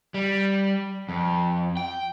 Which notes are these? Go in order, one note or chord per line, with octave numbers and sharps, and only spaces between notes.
G3
F2
G5